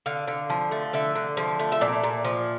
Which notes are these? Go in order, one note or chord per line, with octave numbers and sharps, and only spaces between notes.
D3 F5
D3
F3
A3
D3 E5
D3
F3
A3
E5
A#2 D5
A#2
F3